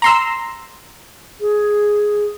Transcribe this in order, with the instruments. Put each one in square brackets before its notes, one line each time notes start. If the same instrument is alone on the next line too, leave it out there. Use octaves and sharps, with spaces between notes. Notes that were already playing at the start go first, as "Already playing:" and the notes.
[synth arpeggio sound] A#5 C6 E6
[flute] G#4